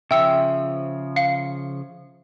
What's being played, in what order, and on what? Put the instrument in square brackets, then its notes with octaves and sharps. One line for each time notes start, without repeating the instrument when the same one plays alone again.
[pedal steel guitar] C#3 F3 [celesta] E5 [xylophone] G5 E6 C#7
[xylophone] F5 C#7